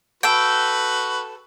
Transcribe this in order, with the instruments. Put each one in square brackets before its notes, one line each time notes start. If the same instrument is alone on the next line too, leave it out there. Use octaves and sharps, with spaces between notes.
[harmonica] F#4 B4 [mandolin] A4 G5